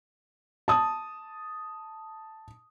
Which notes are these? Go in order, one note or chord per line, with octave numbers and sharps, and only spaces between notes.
A5 D#6